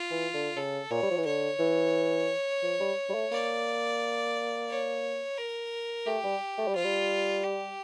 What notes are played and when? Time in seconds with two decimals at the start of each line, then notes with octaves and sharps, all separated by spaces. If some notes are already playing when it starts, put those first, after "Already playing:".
Already playing: F4
0.11 E3
0.34 D3
0.56 C#3 A4
0.91 A#2 C#5
1.03 G3
1.11 F3
1.17 E3
1.26 D3 C#5
1.59 E3
2.63 F3
2.80 G3
3.09 G3
3.14 A3
3.32 A#3 D5
4.70 C#5
5.38 A#4
6.06 A3 G4
6.24 G3
6.58 A3
6.68 G3
6.76 F3 F4
6.85 G3
7.44 G4